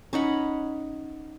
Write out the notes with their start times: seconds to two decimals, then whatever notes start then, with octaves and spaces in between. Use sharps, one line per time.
0.13 C#4 D#4 F#5 B5